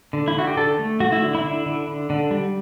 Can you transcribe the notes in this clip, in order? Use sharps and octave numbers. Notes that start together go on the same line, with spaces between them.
D3
E4
D3 F#4
G4
D3 A4
A3
A3 F#4
E4
D3
E4
D3
D3
D3
D3
G3